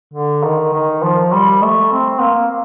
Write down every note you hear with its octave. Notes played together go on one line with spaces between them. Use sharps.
D3
D#3
D#3
F3
G3
A3
C4
A#3